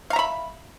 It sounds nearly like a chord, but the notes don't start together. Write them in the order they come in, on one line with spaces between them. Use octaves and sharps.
F5 A#5 E5 B5